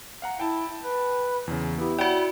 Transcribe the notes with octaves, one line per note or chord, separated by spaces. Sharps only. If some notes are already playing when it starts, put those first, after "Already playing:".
F5 F#5 A#5
E4 G5 A5
B4
E2 C#3
B3 E4 G4
F#4 C#5 D5 F#5 G5